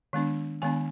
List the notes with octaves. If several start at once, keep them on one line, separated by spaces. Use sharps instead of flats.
D#3 G#3 B3 D4
D#3 G#3 B3 D4 G#5